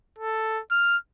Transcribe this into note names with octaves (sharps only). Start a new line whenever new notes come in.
A4
F6